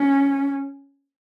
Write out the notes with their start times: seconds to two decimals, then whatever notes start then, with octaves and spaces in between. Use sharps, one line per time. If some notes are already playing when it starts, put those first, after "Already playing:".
Already playing: C#4